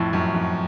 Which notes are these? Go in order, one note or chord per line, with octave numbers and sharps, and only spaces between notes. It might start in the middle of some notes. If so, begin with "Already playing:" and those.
Already playing: F2 A2
F#2
F2